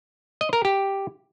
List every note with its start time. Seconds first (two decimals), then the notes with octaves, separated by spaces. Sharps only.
0.41 D#5
0.53 A#4
0.65 G4